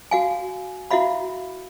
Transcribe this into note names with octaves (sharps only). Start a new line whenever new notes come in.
F#4 F5 G#5
E4 F#4 E5 F5 B5